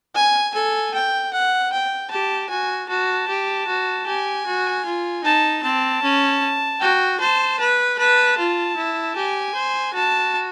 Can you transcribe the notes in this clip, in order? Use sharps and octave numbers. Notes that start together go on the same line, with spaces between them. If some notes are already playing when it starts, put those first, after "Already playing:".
G#5
A4 G#5
G5
F#5
G5
G4 A5
F#4 G#5
F#4 A5
G4
F#4
G4 G#5
F#4
F4
D#4 A5
C4 A5
C#4
F#4 G5
C5 A5
B4
B4 A5
F4
E4
G4 G#5
C5
F#4 A5